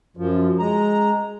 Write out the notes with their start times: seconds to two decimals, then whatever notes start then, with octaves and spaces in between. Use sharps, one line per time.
0.17 F#2 F3
0.59 G#3 A#5